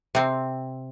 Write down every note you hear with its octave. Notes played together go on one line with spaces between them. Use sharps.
C3 C4